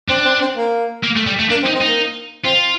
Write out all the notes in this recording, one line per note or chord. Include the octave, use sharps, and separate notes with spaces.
C4 D4
C4
C4
A#3
A#3
A3
G3
A3
A#3 D4
C4
D#4
C4
A#3 D#4
C4 F4